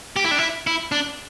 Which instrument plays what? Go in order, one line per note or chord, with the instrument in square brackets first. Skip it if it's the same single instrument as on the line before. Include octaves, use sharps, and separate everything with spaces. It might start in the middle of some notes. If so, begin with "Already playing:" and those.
[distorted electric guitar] G4
E4
D4
E4
E4
D4